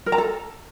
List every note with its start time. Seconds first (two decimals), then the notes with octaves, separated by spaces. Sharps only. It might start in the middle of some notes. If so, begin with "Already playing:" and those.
0.06 A#4
0.12 A#5
0.18 A4